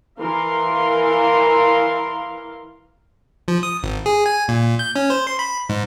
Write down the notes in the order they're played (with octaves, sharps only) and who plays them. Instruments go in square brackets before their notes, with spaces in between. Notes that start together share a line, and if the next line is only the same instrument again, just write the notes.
[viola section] E3 A#4 F5 C6
[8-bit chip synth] F3
D#6
G#1
G#4
G#5
A#2
G6
C#4
C5
C6
B5
G#2